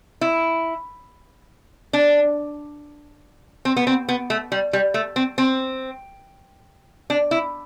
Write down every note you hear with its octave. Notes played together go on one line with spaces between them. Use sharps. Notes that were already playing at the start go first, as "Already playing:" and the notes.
E4
D4
C4
B3
C4
B3
A3
G3
G3
A3
C4
C4
D4
E4